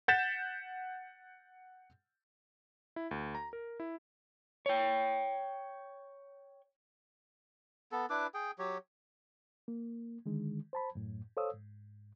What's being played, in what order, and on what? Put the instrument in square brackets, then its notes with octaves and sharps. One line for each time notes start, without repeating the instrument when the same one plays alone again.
[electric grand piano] F#5 G6 A6 B6 E7
E4
D2
A#5
A#4
E4
[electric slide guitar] C#5 G5
[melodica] B3 A4
D4 E4 B4 D6
G#4 G5
F#3 G4 C#5
[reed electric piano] A#3
D3 D#3 G#3
C5 A5 B5
F#2 A2
A4 C5 C#5 F5 D#6 E6
G#2